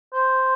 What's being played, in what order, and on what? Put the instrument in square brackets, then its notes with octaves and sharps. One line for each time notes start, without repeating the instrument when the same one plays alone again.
[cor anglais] C5